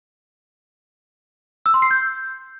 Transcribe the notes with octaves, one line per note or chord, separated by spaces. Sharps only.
E6
C6
C7
G6